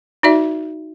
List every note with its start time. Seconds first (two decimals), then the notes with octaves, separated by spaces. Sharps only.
0.23 D#4 F#4 D5 E5